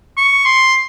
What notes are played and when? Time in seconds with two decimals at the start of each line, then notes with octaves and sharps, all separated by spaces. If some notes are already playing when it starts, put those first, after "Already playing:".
0.17 C#6
0.46 C6